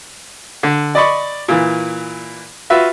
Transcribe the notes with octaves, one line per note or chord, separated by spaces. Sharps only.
D3
D5 D#5 B5 C#6
A#2 E3
F4 F#4 B4 E5